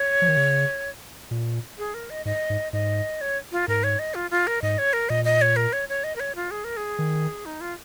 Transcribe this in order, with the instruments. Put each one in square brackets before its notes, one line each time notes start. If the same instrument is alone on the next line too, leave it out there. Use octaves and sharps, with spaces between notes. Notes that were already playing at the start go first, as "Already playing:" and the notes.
Already playing: [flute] C#5
[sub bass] F3
D#3
C#3
A#2
[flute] G#4
A#4
D#5
[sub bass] G#2 [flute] D#5
[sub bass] G#2
[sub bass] G#2 [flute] D#5
[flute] C#5
F4
[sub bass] G#2 [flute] A#4
[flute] C#5
D#5
F4
F4
A#4
[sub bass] G#2 [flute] D#5
[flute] C#5
A#4
[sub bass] A#2 [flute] D#5
[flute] D#5
C#5
A#4
C#5
C#5
D#5
A#4
C#5
F4
G#4
A#4
G#4
[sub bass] D#3
[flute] D#4
F4